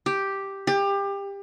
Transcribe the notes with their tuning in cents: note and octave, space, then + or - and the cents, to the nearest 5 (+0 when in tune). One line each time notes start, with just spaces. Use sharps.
G4 +0
G4 +25